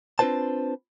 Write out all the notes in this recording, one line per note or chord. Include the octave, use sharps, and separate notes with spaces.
C4 D4 F4 B4 C5 A5